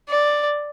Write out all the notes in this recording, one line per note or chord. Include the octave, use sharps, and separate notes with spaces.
D5